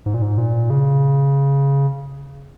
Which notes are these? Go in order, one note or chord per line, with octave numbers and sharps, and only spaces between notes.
G#2
A#2
G#2
A#2
C#3